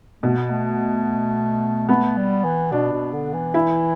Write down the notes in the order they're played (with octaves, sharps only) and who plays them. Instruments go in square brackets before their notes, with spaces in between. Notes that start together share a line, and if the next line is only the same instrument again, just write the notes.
[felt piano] B2 [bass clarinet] A3
[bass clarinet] B3
A3
[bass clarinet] A3 [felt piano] B3
[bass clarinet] G3
E3
[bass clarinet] B2 [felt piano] D4
[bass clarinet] B2
D3
E3
[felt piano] E4